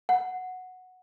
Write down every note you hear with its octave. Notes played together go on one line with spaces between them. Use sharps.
F#5